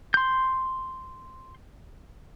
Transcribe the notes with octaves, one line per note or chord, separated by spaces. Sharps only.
C6 G6